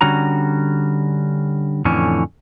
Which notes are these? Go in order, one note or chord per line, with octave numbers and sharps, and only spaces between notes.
D3 G3 C#4 F#4 A#5
F2 A2 D3 E3 C#4